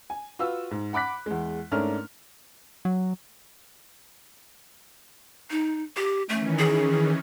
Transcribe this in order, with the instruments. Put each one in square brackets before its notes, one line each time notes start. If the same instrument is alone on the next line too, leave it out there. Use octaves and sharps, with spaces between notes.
[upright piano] G#5
F4 F#4 B4 F5 E6
G#2
F#5 B5 D6 F#6 B6
E2 G#3
G#2 A3 C#4 D4 A#4 F6
[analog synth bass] F#3
[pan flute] D#4
G4
[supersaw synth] D#3 E3 C#4 [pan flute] A3
[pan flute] G#4